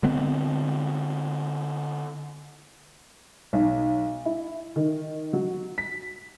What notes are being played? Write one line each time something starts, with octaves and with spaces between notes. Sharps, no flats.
D3 G#3 B3 C4
B1
E4
D#3
F#3
B6